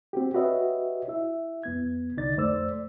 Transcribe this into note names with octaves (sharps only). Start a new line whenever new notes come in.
C4 F#4 G4
F#4 G4 B4 C#5 D#5 E5
E4 E5
F2 B3 G#6
C2 D3 D#4 D5 A6
F2 A3 C5 D5 E6